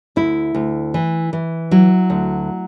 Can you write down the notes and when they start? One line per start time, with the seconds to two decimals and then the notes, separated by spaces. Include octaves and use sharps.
0.16 D2 E4
0.55 D2
0.94 E3
1.33 E3
1.71 F#3 E4
2.10 D2